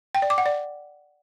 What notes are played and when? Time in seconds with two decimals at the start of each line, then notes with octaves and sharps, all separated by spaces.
0.15 G5
0.22 D5
0.30 D6
0.38 F#5
0.46 D5